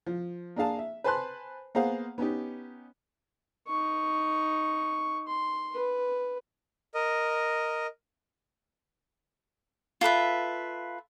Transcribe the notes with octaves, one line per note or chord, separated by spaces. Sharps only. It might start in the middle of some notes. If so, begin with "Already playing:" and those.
F3
A#3 D4 G#4 F5 A5
E5
B4 C5 G#5 A5 C6 F#6
A#3 B3 G#4 C5 F5 F#5
B3 C#4 D#4 G4
D#4 C#6
C6
B4
A#4 D#5
F4 A4 B4 E5